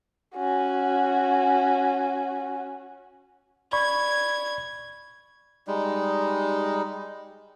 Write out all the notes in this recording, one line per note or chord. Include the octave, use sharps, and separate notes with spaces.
C#4 F#4
D5 B5 C#6 G#6
G3 G#3 D#4